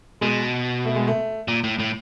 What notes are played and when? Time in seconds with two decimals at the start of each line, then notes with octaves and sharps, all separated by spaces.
0.21 B2 G#3
0.85 A3
0.96 G#3
1.07 A3
1.48 A#2
1.64 A2
1.80 A2